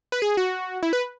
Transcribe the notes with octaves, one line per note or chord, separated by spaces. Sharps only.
B4
G#4
F#4
E4
B4